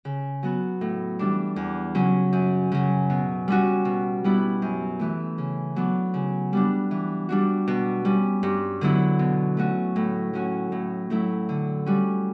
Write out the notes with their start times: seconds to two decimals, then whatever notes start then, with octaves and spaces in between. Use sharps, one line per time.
0.05 C#3
0.43 F#3 B3 F#4
0.81 A2
1.19 E3 G3 D4
1.56 E2
1.95 C#3 F#3 C#4
2.33 F#2
2.72 C#3 F#3
3.10 B2
3.48 G3 C#4 F#4
3.85 B2
4.24 G3 B3 E4
4.62 F#2
4.99 E3 A3
5.38 C#3
5.76 F#3 B3 D4
6.14 C#3
6.53 G3 B3 D4
6.91 E3
7.29 G3 D4 F#4
7.68 B2
8.05 G3 C#4
8.43 G2
8.81 D3 F#3 B3 E4
9.19 B2
9.57 A3 C#4 F#4
9.96 A2
10.33 F#3 C#4 F#4
10.72 A2
11.10 F#3 A3 E4
11.49 D3
11.86 G3 C#4 F#4